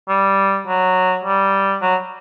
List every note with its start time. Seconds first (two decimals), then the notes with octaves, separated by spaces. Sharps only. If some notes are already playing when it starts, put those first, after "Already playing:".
0.09 G3
0.67 F#3
1.24 G3
1.82 F#3